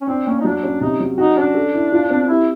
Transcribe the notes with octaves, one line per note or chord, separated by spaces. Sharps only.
C#4
C4 D4
A#3 C#4
D#4
F#3 D4
C#4
C3 D#4
F#3
D#4 F#4
C#4 D4
A4
E4
F4
C4
E4 G4